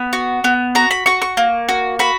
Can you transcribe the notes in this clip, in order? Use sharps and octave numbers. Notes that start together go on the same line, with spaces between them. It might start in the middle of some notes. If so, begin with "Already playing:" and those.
Already playing: B3 B5
F#4
B3
F#4 A#5
B5
F#4 C#6
C#6
A#3
F#4
F#4 B5